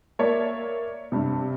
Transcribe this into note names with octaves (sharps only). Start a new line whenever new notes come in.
A#3 C#5 D5 E5
G2 C3